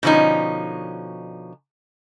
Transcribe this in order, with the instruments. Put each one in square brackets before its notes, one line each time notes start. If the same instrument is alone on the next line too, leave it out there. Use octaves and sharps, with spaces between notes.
[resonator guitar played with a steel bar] B2 D3 F3 C#4 D#4